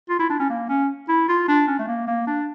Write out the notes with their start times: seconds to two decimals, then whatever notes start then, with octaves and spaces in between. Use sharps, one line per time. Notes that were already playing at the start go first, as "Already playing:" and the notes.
0.10 F4
0.19 E4
0.30 D4
0.40 C#4
0.50 A#3
0.69 C#4
1.09 E4
1.29 F4
1.48 D4
1.67 C#4
1.79 A3
1.88 A#3
2.07 A#3
2.27 D4